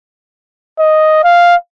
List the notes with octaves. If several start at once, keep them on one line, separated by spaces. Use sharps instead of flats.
D#5
F5